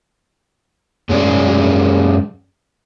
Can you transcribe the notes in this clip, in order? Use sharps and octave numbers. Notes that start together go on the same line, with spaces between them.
F#2 G#3 C#4 G#4 D5